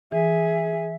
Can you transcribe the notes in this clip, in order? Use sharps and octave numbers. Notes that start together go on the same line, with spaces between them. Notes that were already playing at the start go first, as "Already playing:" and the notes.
E3 G#4 E5